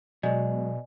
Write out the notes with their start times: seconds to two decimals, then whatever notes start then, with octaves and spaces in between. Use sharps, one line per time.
0.23 B2 F#3 G#3 D5 D#5 G#5